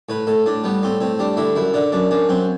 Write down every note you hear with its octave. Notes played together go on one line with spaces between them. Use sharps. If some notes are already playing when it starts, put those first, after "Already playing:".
A2 B4
A2 A4
A2 D4
G3 B3
A2 C4
A2 C4
G3 D4
D3 E4
F#2 E4
D3 D4
F#2 D4
F#2 D4
F#2 C4